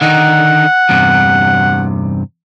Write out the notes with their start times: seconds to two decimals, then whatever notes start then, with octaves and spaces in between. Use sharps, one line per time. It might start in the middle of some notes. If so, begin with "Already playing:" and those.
0.01 D3 D#3 D#4 F#5
0.89 E2 G2 C3